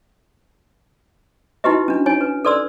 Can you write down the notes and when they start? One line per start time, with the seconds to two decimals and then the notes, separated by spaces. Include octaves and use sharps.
1.64 D#4 E4 F#4 G4 B4 D#5
1.88 C#4 D4
2.06 D#4 C#5 G#5
2.21 B4
2.45 A4 B4 D5 C6 E6